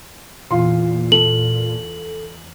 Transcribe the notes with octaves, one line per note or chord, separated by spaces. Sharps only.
E2 A#2 F4 C6
A4 F#7